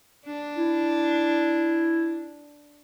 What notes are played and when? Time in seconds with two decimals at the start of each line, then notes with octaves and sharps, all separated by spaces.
0.26 D4
0.57 E4